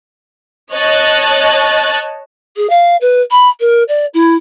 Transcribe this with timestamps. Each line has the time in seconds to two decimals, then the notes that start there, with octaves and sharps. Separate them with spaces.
0.74 C#5 D#5 A5 F#6 A6
2.57 G#4
2.70 F5
3.01 B4
3.31 B5
3.60 A#4
3.88 D5
4.14 E4